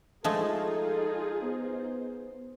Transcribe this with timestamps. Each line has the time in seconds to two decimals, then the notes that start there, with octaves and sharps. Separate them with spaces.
0.24 F3 G#3 A3 D#4 F4 G#4 A4
1.43 B3 C5